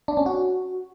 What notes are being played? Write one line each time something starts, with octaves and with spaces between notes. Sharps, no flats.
D4
C#4
F#4